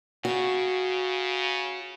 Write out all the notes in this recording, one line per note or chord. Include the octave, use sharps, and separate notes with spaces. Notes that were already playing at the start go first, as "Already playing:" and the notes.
C#3 F#4